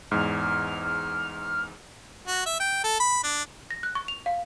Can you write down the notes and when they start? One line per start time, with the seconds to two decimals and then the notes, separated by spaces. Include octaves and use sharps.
0.11 E2 G#2 F6
2.28 F#4
2.46 E5
2.60 G5
2.84 A4
3.00 B5
3.23 D4
3.71 A#6
3.83 F#6
3.95 C#6
4.08 F7
4.26 F5